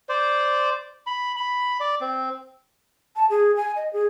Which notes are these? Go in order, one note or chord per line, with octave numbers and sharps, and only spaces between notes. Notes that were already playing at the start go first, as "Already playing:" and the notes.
C5 D5
B5
B5
D5
C4
A5
G#4
G#5
D#5
G#4